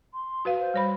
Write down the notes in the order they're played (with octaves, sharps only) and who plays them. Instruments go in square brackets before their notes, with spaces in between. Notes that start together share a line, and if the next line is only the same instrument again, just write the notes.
[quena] C6
[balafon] F#4 B4 F5
[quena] C5
[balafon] G3 C#5 B5